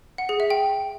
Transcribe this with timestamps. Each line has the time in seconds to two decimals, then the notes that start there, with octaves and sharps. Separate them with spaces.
0.18 F#5
0.29 G#4
0.40 E5
0.50 G5